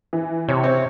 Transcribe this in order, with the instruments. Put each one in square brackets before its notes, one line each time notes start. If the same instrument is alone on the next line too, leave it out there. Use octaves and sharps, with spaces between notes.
[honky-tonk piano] E3
[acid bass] C3 [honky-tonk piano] C#5
[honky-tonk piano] C4 C#5